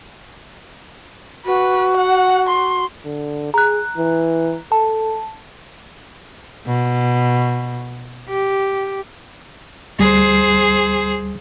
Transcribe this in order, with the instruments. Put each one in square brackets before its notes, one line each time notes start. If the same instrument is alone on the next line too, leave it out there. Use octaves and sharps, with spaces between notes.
[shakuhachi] F#4 [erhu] B4
[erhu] F#5
C6
[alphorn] D3
[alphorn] G#4 [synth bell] A#5 F#6
[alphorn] E3
[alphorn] A4 [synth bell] A5
[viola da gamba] B2
G4
[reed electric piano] D2 G3 [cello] G#4 C5